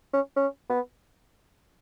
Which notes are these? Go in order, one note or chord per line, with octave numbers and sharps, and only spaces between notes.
C#4
C#4
B3